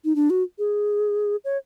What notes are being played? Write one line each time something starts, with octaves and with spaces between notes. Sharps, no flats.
D#4
D4
F#4
G#4
C#5